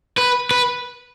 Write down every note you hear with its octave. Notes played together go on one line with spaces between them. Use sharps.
B4
B4